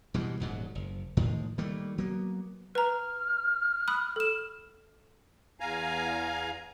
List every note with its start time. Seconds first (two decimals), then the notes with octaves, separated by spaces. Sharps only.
0.14 B2 E3 G3 G#3
0.40 D#1 G#2 F#3
0.75 F#1
1.17 A2 D#3 F3 G#3
1.58 D#3 G3 A3 A#3
1.98 F#3 A#3 B3
2.75 B4 A#5 F6
3.88 B5 D#6 F#6
4.16 A4 E7
5.60 E2 F5 G#5 A#5